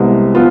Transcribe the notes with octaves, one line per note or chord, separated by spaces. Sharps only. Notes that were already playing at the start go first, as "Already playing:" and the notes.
Already playing: C2 C3 G#3 B3
F3 B3 F4